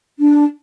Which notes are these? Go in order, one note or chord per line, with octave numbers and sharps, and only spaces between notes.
D4